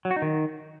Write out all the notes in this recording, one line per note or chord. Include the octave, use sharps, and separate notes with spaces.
F#3
F#4
D#4
D#3